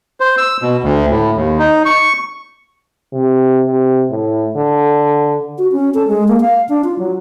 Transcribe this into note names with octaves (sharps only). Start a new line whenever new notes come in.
C5
E6
B2
D2
A2
D#2
D#4
C#6
C3
C3
A2
D3
F#4
C#4
A4
G#3
A#3
F5
D4
F4
F#3